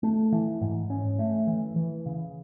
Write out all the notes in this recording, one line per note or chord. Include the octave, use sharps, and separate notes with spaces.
A3
E3
G#2
C#4
A3
E3
E3
C#3